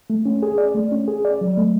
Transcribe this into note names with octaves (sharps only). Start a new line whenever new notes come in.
A3
C#4
G#4
D5
A3
C#4
G#4
D5
F#3
A3